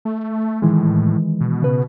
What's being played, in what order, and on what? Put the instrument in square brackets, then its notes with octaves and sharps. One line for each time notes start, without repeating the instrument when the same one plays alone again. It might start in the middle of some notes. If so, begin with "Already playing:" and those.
[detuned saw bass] A3
[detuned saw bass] A2 [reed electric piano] D#3 E3 G#3
[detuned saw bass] B2
[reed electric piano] C#3 B4